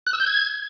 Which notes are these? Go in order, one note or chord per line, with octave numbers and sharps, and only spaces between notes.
F#6
E6
G6
G#6